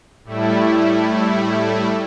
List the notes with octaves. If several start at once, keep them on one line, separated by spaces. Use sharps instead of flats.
A2 G3 A3 E4